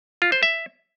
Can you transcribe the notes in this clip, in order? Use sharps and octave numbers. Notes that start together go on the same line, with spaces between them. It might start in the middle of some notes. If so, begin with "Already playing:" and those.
F4
C5
E5